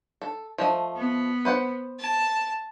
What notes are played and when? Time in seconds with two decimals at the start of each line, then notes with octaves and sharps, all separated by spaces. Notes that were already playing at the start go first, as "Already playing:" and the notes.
0.22 A4
0.58 F3 A3 D#5
0.96 B3
1.45 B4 C5 F#5
1.98 A5